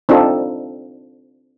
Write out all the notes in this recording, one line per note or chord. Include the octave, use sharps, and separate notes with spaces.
C4 D4 D#4 F4 A4